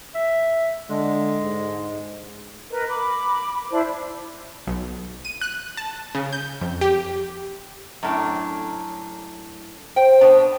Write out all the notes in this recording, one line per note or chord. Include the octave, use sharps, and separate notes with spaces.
E5
D3 G#3
G#2
A#4 B4 D#5
B5 D6
D4 E4 C5 B5
B1
D#7
F#6
A5
C#3
G6
F2
G4
F#2 A2 D4
C5 G5
B2 B3 D4